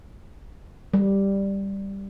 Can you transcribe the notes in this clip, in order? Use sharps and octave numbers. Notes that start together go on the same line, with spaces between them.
G3